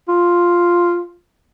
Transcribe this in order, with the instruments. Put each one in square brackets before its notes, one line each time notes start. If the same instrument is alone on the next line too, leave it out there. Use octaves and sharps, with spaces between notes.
[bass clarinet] F4